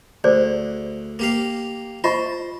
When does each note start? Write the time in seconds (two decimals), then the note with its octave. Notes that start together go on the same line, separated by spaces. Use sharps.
0.24 D2 G#4 C5 D5
1.19 A#3 G4 F5
2.04 F4 C5 D#5 C#6